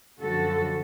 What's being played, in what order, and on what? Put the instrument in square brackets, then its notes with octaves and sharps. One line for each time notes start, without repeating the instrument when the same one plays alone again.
[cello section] F#2 D3 F3 F#4 A4